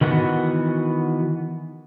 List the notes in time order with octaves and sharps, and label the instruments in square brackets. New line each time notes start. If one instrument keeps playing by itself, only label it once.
[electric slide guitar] D#3 E3 B3 F#4